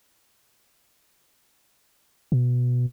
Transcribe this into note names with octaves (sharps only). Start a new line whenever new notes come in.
B2